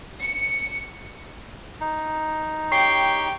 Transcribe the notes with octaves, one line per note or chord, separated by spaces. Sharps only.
C#7
D#4
G4 C#5 G5 C7